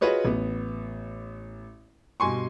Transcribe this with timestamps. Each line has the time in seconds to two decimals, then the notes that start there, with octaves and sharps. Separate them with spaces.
0.01 F4 F#4 G#4 B4 C#5 D#5
0.25 A1 B3
2.20 G2 B2 G#5 C6 C#6